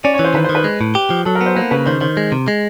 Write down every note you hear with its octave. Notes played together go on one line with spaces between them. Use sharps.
C#4 D5
C#5
E3
C5
D#3 B4
C5
D#3
B4
G#3
A2
G4
F3
F#3 A4
A#4
B3
C5
A#3 B4
C#3 B4
D#3 C5
D#3 C5
G#3
C3
G#3